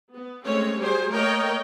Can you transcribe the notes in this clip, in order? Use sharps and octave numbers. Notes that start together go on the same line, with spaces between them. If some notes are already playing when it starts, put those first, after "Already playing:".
B3
G#3 A3 C4 C#4 C#5
F#3 G3 G4 G#4 C5 G#5
A3 A#3 A#4 C#5 D#5 G5